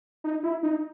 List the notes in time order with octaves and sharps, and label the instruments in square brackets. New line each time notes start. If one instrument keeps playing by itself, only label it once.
[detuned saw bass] D#4
E4
D#4